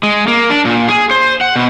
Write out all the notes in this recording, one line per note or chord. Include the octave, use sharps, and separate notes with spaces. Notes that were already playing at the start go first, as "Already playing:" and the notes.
G#3
A#3
D4
A#2
G#4
C5
F#5
B2